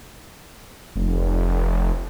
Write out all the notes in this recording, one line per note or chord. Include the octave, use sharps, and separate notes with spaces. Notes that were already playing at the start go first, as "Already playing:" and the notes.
F1